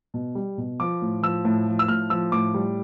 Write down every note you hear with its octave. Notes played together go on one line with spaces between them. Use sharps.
B2
G3
B2
F3 D6
A2
F3 E6
A2
F3
E6
A2 F6
F3 E6
A2 D6
G3